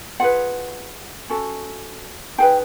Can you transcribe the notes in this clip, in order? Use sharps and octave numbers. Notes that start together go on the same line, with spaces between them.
F4 G#4 B4 F#5
C#4 F#4 A4
D#4 G#4 B4 G5